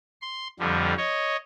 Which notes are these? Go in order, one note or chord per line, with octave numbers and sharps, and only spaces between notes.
C6
F2 D3 F3 G3
C#5 D#5